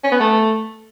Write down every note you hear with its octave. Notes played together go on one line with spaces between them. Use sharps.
C#4
B3
A3